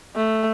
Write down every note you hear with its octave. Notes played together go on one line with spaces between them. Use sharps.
A3